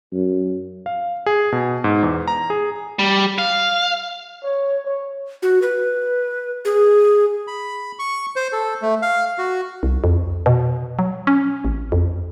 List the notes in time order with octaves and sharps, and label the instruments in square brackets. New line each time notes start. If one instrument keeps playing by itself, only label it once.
[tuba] F#2
[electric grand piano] F5
G#4
B2
G#2
E2
A#5
G#4
[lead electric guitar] G3
F5
[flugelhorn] C#5
C#5
[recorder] F#4
B4
G#4
[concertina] B5
C#6
C5
A4
A3
F5
F#4
[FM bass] C2
F2
B2
F#3
C#4
A1
F2